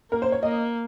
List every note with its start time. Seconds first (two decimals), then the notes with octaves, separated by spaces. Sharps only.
0.12 A#3 A#4
0.22 C5
0.32 C#5
0.42 A#3 D#5